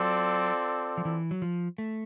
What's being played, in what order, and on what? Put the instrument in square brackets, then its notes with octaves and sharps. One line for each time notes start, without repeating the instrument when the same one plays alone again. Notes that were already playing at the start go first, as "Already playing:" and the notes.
Already playing: [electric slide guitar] F#3 [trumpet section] C4 F4 A4 D5
[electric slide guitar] F3
E3
F#3
F3
A3